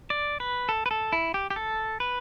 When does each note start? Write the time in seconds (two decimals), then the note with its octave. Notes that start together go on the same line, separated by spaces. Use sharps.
0.10 D5
0.40 B4
0.69 A4
0.86 B4
0.91 A4
1.13 E4
1.34 G4
1.50 G4
1.56 A4
2.00 B4